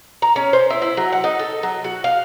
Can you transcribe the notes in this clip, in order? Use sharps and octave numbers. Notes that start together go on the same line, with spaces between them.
A#5
C#4
C5
E4
E4
F#3
F#5
D#4
A4
F#3
F#4
F5